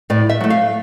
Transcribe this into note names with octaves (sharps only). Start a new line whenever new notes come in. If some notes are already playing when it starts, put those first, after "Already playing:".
A2 D5
E5
F#3 A3
F5